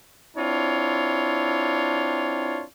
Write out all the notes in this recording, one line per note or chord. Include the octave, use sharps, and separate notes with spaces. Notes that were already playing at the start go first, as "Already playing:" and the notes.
C4 D4 E4 F4 C#5